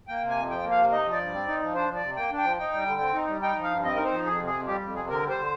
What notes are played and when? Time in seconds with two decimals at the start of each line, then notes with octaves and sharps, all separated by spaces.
0.08 A#3 G5
0.23 C3
0.29 G#5
0.36 F2
0.50 F3 G5
0.64 A#3
0.71 F5
0.78 C3
0.92 D#4 D#5
1.06 F3
1.12 D5
1.19 G2
1.34 C4
1.47 D#4
1.61 F3
1.75 D4 C5
1.89 F3
1.96 D5
2.03 C3
2.16 A#3 G5
2.31 D4
2.38 G5
2.44 F3
2.58 D#4 G5
2.73 G3
2.87 D3
3.01 C4
3.14 D#4
3.28 G3
3.42 D#4 G5
3.57 F3
3.63 F5
3.71 G2
3.84 C4 D#5
3.96 D#4 A#4
4.05 C5
4.12 F3
4.26 F2 G#4
4.39 C3
4.46 G#4
4.54 F2
4.67 G3 G4
4.81 F2
4.95 C3 G#4
5.09 D3 A#4
5.23 G3
5.30 C5
5.37 D3